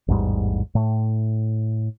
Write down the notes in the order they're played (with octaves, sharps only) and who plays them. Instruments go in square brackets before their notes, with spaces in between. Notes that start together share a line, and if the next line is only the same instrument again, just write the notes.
[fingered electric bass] A1 E2 G#2 G3
A2